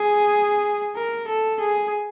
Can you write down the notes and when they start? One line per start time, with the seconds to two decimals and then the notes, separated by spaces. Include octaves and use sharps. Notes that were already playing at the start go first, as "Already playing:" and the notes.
Already playing: G#4
0.96 A#4
1.28 A4
1.60 G#4